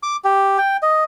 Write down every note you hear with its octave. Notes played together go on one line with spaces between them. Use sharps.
D6
G4
G5
D#5